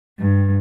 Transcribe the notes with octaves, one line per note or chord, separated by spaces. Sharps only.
G2